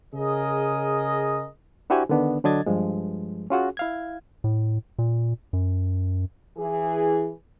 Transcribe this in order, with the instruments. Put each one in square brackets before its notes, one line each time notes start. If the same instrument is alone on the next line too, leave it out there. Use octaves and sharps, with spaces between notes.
[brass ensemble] C#3 G#4 A#4 D#5
[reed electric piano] D4 E4 F#4 G4 C5 G#5
D3 D#3 B3 D4
D3 F#3 D4 D#5 G#6 A6
G2 F3 G#3
C#4 F4 F#4 G#4
E4 F5 G#6
[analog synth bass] A2
A#2
F#2
[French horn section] E3 G#4